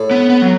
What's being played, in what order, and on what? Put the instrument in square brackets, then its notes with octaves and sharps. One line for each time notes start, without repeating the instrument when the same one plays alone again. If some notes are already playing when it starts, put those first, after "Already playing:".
Already playing: [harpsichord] A2
[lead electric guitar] B3
B3
F#3